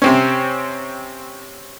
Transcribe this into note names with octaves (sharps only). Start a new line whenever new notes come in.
C3 C4 C#4